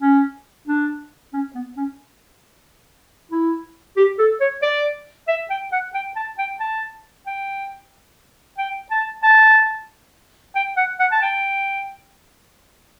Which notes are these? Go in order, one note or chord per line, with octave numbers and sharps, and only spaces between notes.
C#4
D4
C#4
B3
C#4
E4
G4
A4
C#5
D5
E5
G5
F#5
G5
A5
G5
A5
G5
G5
A5
A5
G5
F#5
F#5
A5
G5